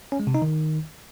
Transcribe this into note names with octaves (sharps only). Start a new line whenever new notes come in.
C#4
G#3
C3
D#4
D#3